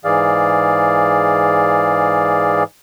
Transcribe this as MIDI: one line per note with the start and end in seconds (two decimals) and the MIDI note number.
0.05 2.63 44
0.05 2.63 52
0.05 2.63 68
0.05 2.63 74
0.05 2.63 77